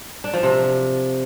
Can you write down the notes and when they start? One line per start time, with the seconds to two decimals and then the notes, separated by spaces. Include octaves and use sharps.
0.24 D4
0.34 F3
0.43 C3